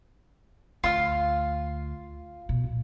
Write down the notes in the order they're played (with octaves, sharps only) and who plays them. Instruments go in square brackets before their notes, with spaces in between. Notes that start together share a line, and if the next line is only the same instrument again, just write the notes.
[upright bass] D2 [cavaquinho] F4 F5
[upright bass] B2
A#1